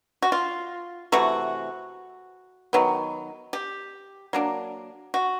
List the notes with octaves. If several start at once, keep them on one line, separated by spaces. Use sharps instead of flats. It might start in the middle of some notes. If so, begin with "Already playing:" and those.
F#4
F4
C3 E3 A3 F#4
D#3 F#3 B3
G4
F#3 A#3 D4
F#4